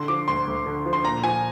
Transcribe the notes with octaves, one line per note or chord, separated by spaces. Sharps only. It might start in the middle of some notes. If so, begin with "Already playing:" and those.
Already playing: D3 C6
F3 D6
D2 C6
D2
D3
F3
C6
A#2 A#5
F3 G#5